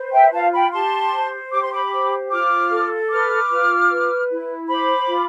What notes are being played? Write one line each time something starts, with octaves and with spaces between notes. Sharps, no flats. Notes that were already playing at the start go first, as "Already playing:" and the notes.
Already playing: B4 C5
E5 G5
F4 F5 A5
G5 B5
G4 A5 C6
C5
G4 D6
C6
B5 D6
C5
F4 D6 F6
A4
B4 D6 F6
F4
B4
E4
C5 B5 D6
F4